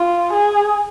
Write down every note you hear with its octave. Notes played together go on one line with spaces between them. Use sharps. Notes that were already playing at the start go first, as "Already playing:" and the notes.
Already playing: F4
G#4